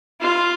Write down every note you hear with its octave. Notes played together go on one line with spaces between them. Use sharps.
F4